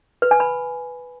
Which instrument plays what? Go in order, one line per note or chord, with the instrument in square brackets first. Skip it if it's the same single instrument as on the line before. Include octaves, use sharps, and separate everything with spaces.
[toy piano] B4
G#5
B5